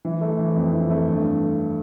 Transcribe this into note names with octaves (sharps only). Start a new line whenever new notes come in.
E3
A3
E3
F2
E3
A3
G2